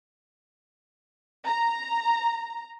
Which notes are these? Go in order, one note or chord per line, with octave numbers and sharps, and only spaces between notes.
A#5